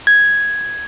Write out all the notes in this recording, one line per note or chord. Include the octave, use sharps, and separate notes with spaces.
G#6